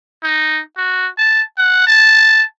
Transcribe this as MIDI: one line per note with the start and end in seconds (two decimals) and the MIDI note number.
0.23 0.61 63
0.77 1.08 66
1.17 1.42 81
1.58 1.87 78
1.87 2.43 81